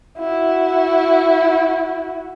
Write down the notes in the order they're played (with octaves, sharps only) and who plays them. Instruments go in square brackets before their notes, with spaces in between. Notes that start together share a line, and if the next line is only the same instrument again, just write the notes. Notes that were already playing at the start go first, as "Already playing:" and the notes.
[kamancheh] E4 F#4